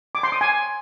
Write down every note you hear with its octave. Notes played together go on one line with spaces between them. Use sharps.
D6
C6
D#6
G#5